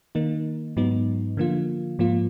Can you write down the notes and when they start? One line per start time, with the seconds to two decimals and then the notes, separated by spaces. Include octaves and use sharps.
0.15 D#3 A#3 D#4
0.77 G#2 F#3 B3 D#4
1.37 D3 F3 A#3 F4
1.99 G#2 F3 A#3 F4